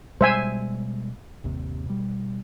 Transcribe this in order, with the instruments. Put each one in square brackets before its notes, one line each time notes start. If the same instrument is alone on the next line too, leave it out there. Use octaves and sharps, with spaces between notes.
[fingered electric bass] B2 G3 G#3 [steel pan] C5 E5 G#5
[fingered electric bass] G1 D#2 C3
B2 G3